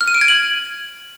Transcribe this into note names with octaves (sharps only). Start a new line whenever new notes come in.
F6
D#7
D7
G#6
F#7